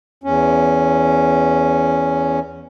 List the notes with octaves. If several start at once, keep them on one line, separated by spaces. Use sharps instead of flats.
E2 C#4